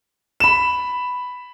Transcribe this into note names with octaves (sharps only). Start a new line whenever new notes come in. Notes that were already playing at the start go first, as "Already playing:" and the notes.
B5 E7